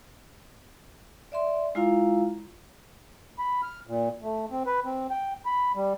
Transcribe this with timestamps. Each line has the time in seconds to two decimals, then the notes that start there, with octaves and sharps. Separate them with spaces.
1.32 D5 E5 C6
1.75 G#3 E4 F4 F5 A#5
3.39 B5
3.63 F6
3.87 A#2
4.22 A3
4.51 C4
4.66 B4
4.85 C4
5.10 G5
5.46 B5
5.75 G3